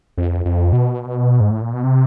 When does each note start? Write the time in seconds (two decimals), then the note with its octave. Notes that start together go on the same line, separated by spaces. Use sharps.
0.17 F2
0.45 F2
0.73 B2
1.41 G#2
1.51 A2
1.62 A#2
1.74 B2
1.84 C3